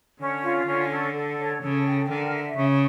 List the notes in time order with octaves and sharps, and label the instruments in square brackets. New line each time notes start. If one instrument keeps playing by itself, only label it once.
[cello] D3 [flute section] C#4
[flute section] F4
[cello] D3 [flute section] C#4
[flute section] A4
A4
C#5
[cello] C#3 [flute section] A4
[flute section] G5
[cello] D3 [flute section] A#4
[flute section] E5
[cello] C#3 [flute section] C#6